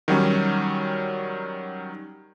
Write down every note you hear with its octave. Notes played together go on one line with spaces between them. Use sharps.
D#3 F#3 G3 C#4